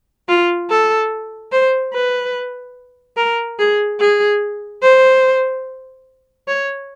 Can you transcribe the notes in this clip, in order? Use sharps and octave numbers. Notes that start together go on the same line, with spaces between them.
F4
A4
C5
B4
A#4
G#4
G#4
C5
C#5